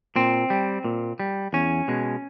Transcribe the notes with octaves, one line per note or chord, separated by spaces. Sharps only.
A#2 C4
G3
A#2
G3
E2 C#4
B2 G#3